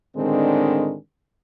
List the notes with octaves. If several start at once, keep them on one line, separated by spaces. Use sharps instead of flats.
A2 D3 D#3 G#3 C4 D4